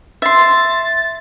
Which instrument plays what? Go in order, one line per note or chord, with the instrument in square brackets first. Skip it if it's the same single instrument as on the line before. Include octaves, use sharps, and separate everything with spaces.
[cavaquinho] E5 C6 [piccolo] A6